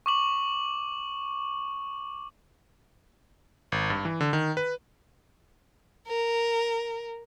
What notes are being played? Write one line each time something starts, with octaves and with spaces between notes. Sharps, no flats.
C#6 D6 F#7
G#1
G2
E3
D3
D#3
B4
A#4